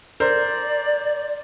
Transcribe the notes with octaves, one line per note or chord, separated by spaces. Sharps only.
A#4 C5 D5